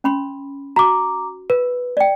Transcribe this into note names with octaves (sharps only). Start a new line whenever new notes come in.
C#4 B5 C6
F#4 A#5 D6
B4
D5 G5